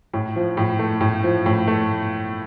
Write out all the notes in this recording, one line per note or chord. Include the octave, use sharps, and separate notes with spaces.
A2
F3
A2
A3
A2
F3
A2
A3